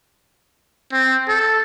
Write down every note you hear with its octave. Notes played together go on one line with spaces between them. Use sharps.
C4
A4